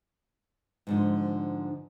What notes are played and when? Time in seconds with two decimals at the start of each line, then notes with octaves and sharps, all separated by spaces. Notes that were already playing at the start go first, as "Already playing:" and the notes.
0.87 G#2 D3 F3